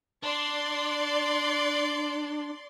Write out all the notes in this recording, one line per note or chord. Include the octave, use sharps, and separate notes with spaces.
D4 D5 C6